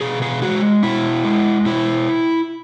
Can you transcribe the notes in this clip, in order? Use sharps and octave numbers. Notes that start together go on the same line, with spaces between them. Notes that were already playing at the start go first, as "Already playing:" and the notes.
B2 G#4
G#4
G#3 F#4
B2 E4
G#3
B2 E4